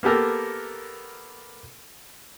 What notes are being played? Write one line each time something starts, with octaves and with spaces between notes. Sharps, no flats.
A#3 B3 G4 A4 A#4